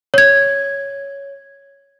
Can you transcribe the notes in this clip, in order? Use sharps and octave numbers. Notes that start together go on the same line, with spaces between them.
C#5 G#6